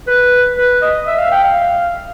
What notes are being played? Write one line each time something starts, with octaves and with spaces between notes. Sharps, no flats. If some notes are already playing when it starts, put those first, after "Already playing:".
B4
B4
D#5
E5
F5
G5
F5